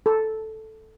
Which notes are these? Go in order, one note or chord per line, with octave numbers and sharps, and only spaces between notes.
A4